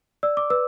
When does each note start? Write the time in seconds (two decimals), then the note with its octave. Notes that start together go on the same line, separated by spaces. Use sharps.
0.23 D5 E6
0.37 D6
0.50 B4 E6